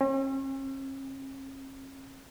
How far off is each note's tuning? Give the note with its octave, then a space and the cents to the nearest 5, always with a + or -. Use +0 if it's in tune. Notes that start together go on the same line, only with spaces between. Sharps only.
C#4 -45